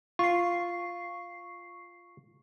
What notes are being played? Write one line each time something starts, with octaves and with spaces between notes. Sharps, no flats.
F4 C#6 C7